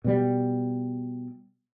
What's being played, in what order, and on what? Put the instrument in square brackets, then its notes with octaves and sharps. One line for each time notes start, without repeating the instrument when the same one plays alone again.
[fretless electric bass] B2 G3